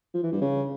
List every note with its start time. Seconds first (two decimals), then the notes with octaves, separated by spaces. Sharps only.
0.14 F3
0.23 E3
0.32 G2
0.41 C#3